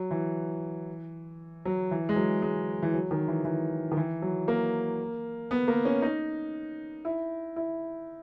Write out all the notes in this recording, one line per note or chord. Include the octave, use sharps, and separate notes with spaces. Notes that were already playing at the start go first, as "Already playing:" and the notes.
Already playing: F#3
E3
F#3
E3
G#3
F#3
G#3
E3
F#3
D#3
E3
E3
D#3
E3
F#3
A#3
B3
A#3
C#4
D#4
E4
E4